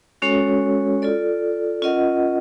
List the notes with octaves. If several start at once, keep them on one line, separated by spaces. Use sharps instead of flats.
G#3 C#4 F#4 A4 C#5
F4 A4 D5
C#4 F4 A#4 D#5 F#5